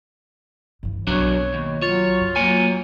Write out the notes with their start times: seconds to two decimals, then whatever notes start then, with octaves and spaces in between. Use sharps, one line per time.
0.83 G2 E3
1.07 B1 F#3 D4 F#4 C#5
1.54 D#2
1.82 F#3 F4 C#5
2.21 F#2
2.36 F#3 A#3 C#5 G#5